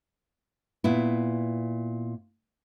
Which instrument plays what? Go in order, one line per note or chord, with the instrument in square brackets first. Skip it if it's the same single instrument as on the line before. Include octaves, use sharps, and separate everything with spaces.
[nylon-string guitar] A#2 B3 E4